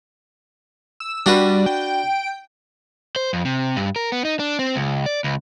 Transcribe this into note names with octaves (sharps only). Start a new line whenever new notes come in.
E6
G3 D4 F#4 B4
G5
C5
F2
C3
G2
A#4
B3
D#4
D4
C4
C#2
D5
C#2